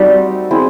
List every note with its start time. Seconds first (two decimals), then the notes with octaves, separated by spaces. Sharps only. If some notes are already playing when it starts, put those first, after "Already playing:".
Already playing: G3 A3 C4 D#4 F#4
0.51 G#3 C4 E4